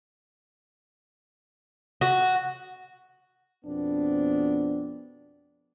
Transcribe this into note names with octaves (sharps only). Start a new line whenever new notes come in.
F#4
F2 B2 B3 C4 D4